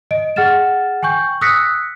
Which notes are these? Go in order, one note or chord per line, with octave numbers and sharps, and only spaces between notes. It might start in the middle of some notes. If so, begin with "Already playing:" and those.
D#5 D7
G#4 F#5 F6 A6 E7
G5 G#5 C#6 G6
D#6 E6 F#6 A#6 B6 C#7